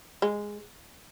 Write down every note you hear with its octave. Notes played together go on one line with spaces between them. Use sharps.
G#3